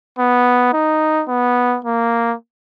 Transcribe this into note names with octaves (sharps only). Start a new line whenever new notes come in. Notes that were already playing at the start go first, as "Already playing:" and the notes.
B3
D#4
B3
A#3